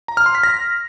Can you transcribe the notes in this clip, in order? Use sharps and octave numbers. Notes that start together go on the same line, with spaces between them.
A#5
F6
C6
B6
A#6